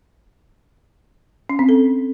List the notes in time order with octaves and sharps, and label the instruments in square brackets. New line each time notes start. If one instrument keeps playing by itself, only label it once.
[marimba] C#4
C4
A4